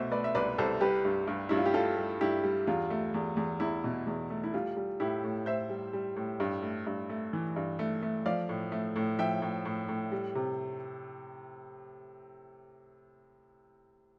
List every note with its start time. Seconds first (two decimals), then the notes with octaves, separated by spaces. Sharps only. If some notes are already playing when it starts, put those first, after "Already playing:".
Already playing: C2 B2 A3 C5 E5
0.11 A3 B4 D5
0.24 E5
0.35 C2 B4 D5
0.58 C2 A4 C5
0.81 G3 G4 B4
1.05 G2
1.28 G2
1.49 G2 E4
1.57 F4
1.66 G4
1.74 G3 F4 A4
1.97 G3
2.21 G2 E4 G4
2.44 G3
2.67 E2 F4
2.90 A3
3.14 E2
3.37 E2
3.60 E2 E4
3.84 B2
4.07 E2
4.30 A3
4.44 E4
4.54 G3 F4
4.77 G3
5.00 A2 E4 G4
5.24 A2
5.46 A2 C5 E5
5.70 G3
5.93 G3
6.16 A2
6.40 G2
6.62 A3
6.87 G2
7.10 A3
7.33 E3
7.56 G2
7.79 A3
8.03 A3
8.26 F3 D5 F5
8.49 A2
8.72 A3
8.96 A2
9.19 F3 E5 G5
9.42 A2
9.65 A2
9.88 A2
10.12 G3
10.35 C3